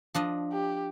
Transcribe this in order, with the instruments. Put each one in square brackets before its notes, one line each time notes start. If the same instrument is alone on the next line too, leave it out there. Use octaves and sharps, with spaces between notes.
[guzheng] F3 D4 D#5
[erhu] G4